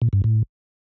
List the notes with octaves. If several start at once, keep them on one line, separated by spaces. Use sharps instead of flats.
A#2
G2
A2